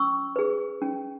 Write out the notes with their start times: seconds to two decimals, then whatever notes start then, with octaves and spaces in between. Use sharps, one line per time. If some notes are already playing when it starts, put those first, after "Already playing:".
Already playing: C#4 C#6 E6
0.36 G#4 B4
0.82 C#4